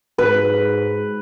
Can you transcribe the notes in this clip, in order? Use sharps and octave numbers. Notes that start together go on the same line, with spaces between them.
G#2 B4